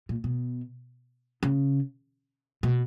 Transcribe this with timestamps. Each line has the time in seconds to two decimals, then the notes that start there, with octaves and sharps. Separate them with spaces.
0.09 A#2
0.24 B2
1.43 C#3
2.63 B2